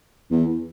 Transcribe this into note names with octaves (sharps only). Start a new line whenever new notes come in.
E2